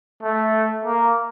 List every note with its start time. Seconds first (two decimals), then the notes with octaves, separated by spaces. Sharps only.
0.23 A3
0.85 A#3